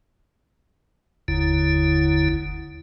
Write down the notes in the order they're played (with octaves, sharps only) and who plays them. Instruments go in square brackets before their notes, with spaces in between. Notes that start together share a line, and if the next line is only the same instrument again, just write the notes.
[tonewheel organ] F#1 D#2 D3 E4